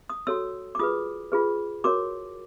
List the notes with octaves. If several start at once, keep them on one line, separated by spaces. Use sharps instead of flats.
D#6
F#4 A4 C#5 E6
D6
F4 G#4 B4 D#6
F4 G#4 B4
F#4 A#4 C#5 D6